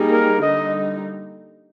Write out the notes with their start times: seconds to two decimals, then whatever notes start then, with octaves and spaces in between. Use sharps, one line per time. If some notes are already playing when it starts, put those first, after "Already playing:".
Already playing: G3 A#3 D#4 G#4
0.11 A#4
0.41 D3 G3 A#3 D#4 D#5